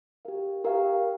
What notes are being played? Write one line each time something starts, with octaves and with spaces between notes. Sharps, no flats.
G4 A#4 F5
G4 A#4 F5